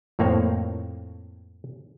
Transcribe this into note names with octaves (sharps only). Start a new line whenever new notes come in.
F2 A2 A#3 C4 C#5